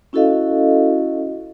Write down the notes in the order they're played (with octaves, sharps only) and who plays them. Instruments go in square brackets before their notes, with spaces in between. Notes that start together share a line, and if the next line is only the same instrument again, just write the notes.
[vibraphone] C#4 E4 F#4 A4 D#5 F5